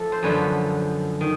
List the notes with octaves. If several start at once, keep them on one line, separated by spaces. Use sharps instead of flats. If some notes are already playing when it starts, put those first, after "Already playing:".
Already playing: F3 A3 A4
C5
F#2 D3 F3 B4 C#5
D#3